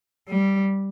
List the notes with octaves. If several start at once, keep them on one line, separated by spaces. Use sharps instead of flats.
G3